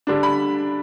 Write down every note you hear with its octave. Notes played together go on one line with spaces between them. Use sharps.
D3 G3 D4
B5